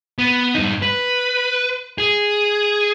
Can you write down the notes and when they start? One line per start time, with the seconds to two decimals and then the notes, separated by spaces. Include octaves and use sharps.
0.18 B3
0.55 G2 D#4
0.82 B4
1.98 G#4